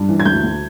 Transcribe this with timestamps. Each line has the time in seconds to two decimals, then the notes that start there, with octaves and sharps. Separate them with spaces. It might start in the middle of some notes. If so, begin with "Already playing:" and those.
Already playing: G2
0.09 E3
0.20 G#6
0.25 D2 G6
0.43 D2